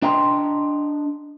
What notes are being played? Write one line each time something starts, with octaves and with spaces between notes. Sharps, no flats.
D4 D#5 G5 A#5 C6